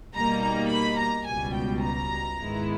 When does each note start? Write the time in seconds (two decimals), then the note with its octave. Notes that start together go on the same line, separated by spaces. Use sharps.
0.15 B2 G3 A#3 D#4 A#5
0.43 A#5
0.70 B5
0.99 A#5
1.26 C#2 B2 G3 G#5
1.55 G5
1.83 A#5
2.39 G#2 D#3 G#3 B3 E4